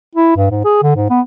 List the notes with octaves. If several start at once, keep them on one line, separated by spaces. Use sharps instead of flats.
E4
G2
G#2
G#4
D3
G#2
B3